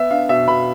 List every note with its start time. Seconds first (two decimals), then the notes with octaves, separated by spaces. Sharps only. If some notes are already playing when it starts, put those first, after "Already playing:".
Already playing: B3 E5
0.11 D4 F5
0.29 B2 E5
0.48 B2 B5